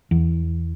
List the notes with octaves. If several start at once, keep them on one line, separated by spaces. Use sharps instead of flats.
E2